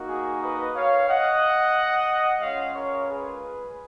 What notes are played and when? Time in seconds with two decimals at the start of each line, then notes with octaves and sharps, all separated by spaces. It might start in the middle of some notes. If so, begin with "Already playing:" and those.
Already playing: A#3 D#4 F#4
0.09 G#4
0.41 B4 D#5
0.74 C#5 F5
1.08 D#5 F#5
2.40 G#3 C#4 F4 C#5 F5
2.74 A#4 C#5
3.07 G#4 B4